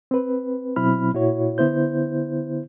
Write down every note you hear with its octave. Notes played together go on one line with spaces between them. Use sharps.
C4 B4
B2 F#3 C4 E4 B5 F6
A#2 E4 F#4 C#5
D3 B3 E4 C5 G6